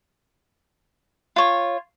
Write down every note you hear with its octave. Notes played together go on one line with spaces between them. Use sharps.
F4 C#5